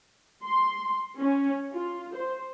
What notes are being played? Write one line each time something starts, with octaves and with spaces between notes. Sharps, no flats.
C6
C#4
F4
C5